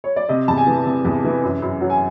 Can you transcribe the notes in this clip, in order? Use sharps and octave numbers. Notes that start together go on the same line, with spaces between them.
C#5
D5
C3 D#5
E2 A5
G#5
E3
C3
E2
E3
F#2
F#2
F#3
G#5